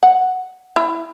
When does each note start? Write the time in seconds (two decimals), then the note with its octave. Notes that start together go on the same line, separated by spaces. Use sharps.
0.03 F#5
0.76 E4